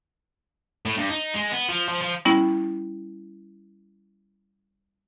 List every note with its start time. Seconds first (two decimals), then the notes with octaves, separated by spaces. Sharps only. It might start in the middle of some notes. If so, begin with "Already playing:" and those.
0.85 A2
0.98 G2
1.09 D#4
1.34 G#3
1.52 B3
1.69 F3
1.89 F3
2.02 F3
2.25 G3 B3 C#4 E4